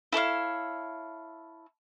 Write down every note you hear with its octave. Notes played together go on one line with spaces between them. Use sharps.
E4 A4 C#5 F5